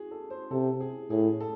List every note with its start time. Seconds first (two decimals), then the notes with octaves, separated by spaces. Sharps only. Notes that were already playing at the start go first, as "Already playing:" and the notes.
Already playing: F#4 G#4
0.11 A4
0.30 C5
0.51 C3 A4
0.80 G#4
1.10 A2 G#4
1.40 A4